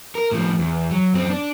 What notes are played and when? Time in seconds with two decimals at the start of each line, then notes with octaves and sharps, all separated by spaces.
0.15 A#4
0.32 A2 F3
0.59 E2
0.91 F#3
1.14 F#2 C4
1.30 D4